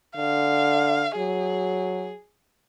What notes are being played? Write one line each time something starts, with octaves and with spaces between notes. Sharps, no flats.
D3 F5
F#3 G#4